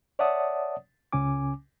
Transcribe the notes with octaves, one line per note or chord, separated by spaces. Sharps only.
C#5 D5 E5 F#5 A5 D#6
C#2 C#3 C#4 G#5 D6